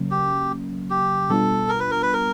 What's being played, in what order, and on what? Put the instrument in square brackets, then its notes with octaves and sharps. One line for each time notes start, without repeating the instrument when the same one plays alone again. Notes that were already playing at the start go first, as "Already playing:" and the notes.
Already playing: [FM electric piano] C#3 F#3 A#3 C#4
[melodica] G4
G4
[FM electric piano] B2 G3 B3 D4 F4 [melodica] A4
[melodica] A#4
B4
A#4
B4
A#4